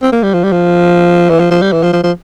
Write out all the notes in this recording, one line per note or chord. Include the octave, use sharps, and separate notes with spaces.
C4
A#3
G3
F3
G3
F3
E3
F3
F3
G3
E3
F3
F3
F3